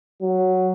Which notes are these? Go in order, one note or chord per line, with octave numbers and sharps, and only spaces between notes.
F#3